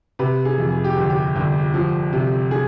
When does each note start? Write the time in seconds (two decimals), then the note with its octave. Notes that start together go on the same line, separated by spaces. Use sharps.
0.19 C3 B4
0.45 G#4
0.58 F2
0.72 G#4
0.84 G4
0.96 G1
1.10 G4
1.36 G1
1.74 F3
2.13 C3
2.51 G#4